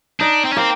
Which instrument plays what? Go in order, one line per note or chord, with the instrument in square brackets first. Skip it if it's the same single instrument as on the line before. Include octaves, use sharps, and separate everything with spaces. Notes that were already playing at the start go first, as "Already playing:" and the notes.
[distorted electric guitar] D4 [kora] D#4
[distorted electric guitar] C4
C#4
[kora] A#3 [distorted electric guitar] C4